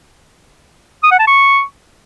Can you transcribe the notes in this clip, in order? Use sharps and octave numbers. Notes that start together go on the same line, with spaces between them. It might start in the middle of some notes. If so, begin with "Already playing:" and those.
D#6
F#5
A5
C#6